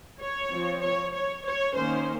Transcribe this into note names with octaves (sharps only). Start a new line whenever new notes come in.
C#5
F3 C4
C#5
C#5
C#5
D#3 A#3 C#4 C5